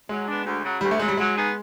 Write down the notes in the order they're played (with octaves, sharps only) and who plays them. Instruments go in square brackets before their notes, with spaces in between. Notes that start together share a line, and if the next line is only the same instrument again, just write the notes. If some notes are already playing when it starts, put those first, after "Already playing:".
[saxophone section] F#3 [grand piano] G#3
[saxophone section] B3 D4
D2
C#3 F#3
[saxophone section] D2 [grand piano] G3
[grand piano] A3
[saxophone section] F#3 [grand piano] G#3
[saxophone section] C#3 [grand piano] G3
[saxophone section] F#3 [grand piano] G#3
[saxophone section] B3 D#4 G#4